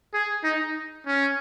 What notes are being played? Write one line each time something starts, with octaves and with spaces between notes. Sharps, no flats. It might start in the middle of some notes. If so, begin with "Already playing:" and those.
G#4
D#4
C#4